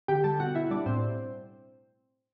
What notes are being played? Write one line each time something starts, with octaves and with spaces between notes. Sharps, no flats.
D3 G4 G5
G3 A4 A5
B2 F#4 F#5
B2 E4 E5
G3 D4 D5
A2 C4 C5